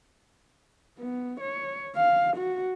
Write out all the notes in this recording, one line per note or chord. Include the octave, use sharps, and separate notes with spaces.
B3
C#5
F5
F#4